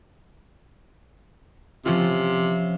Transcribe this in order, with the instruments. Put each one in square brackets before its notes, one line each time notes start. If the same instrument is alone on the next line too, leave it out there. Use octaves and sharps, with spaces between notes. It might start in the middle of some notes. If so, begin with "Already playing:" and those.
[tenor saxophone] C3 [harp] F3 C#4 F4